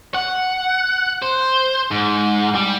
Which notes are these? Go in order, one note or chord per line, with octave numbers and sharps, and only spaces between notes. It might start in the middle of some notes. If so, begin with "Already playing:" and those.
F#5
C5
G#2
G3